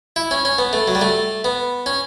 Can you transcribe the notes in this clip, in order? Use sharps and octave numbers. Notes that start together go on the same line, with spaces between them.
E4
C#4
C#4
B3
A3
F#3
G3
A3
B3
C#4